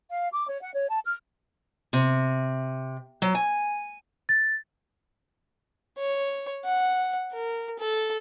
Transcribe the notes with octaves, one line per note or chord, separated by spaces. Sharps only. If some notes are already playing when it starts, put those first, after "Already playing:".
F5
D6
C#5
F#5
C#5
A5
F6
C3
F#3
G#5
A6
C#5
F#5
A#4
A4